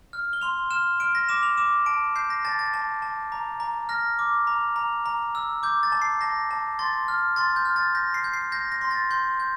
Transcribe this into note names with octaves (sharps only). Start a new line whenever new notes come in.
F6
G7
C6 F7
F6 E7
F6 D7
A#6
D6 E7
F7
D6 E7
A5 D7
G6 C7
A#6
A5 A6
A6
A5
A5
A#5
A#5
F6 A#6
D6
A#5
A#5
A#5
E6
D6 G6
A6
A5
C7
A5 A#6
A5
C6 A6
F6
C6 A6
G6
F6
A6
G6 A#6
C7
G6
C7
G6 A#6
A#6
C6
A6
C6 G6
G6